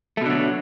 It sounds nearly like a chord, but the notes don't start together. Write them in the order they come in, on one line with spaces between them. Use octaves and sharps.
A3 B2 D3 F#3